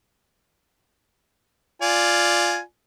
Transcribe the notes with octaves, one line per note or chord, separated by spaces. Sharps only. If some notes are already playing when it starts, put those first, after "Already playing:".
F4 D5 G#5